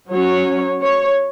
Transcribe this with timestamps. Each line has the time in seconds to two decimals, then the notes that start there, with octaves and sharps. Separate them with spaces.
0.11 F#3 C#4 C#5
0.82 C#5